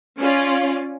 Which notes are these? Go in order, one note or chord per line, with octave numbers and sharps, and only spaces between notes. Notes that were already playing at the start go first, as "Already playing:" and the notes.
C#4 F4 D5